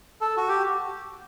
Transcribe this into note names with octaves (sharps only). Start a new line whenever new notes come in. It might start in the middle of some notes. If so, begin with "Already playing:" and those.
A4
F#4
G4